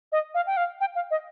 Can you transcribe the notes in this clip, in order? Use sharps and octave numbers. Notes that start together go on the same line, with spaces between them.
D#5
F5
G5
F5
G5
F5
D#5